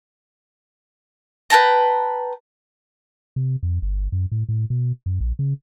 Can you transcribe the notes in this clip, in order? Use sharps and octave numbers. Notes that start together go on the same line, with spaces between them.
B4 G5 A5 A#5
C3
F2
G1
F#2
A2
A2
B2
F#2
A#1
C#3